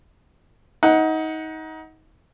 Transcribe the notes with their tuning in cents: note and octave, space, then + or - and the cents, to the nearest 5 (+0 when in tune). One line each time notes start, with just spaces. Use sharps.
D#4 +25 F#5 +0